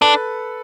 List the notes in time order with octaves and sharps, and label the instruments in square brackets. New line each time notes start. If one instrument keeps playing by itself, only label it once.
[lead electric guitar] D4 [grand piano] A4 B4